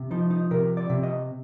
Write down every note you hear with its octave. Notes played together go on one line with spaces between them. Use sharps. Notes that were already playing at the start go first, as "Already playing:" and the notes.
Already playing: C3
F3 D#4
D#4
C3 A#4
D5
C3
D#5